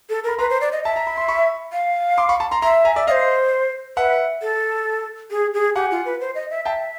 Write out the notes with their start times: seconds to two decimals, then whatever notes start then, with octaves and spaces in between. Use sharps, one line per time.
0.10 A4
0.24 A#4 B5
0.38 B4 A#5 C6
0.50 C5
0.61 D5
0.72 D#5
0.84 E5 A5
0.96 A#5
1.07 B5
1.17 C6
1.28 B5 C#6
1.73 F5
2.18 C6 D6
2.29 B5 C#6
2.40 A5 B5
2.51 A#5 C6
2.62 E5 A#5 C6
2.85 G#5 A#5
2.96 D5 E5
3.07 D5 D#5 F5
3.11 C5
3.97 B4 E5 F#5
4.42 A4
5.31 G#4
5.54 G#4
5.76 G4 F#5 G#5
5.91 F4
6.05 B4
6.21 C5
6.35 D#5
6.50 E5
6.65 F5 G5 A5
6.69 E5